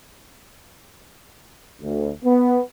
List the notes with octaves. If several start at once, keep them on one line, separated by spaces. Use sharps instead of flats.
D2
B3